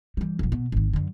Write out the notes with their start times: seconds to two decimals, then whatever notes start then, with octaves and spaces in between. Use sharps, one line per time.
0.17 E3 G3
0.39 E1 F#3
0.52 B2
0.72 G#1 D#3
0.93 F#2 D3